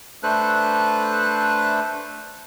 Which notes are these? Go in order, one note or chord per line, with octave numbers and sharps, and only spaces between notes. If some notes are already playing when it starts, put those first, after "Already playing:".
A3 D4 A4 B4 C5 F#6